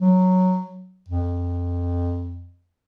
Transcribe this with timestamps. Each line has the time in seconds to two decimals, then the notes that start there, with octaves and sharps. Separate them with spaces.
0.01 F#3
1.09 F2